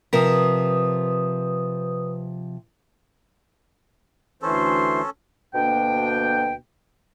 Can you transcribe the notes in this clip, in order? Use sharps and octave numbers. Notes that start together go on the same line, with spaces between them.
C3 F3 A#4 B4 D#6
D2 E3 C#4 A4 C5 C6
D2 B2 A#3 D4 G5